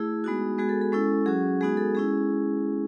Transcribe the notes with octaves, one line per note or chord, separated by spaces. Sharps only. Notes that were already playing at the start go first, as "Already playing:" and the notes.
Already playing: A3 E4 G#4
G#3 B3 D#4 F#4
G#3 B3 F#4 G#4
A4
A4
G#3 C#4 E4 A4
F#3 C#4 F#4 G#4
G#3 B3 D#4 F#4 G#4
A4
G#3 C#4 E4 G#4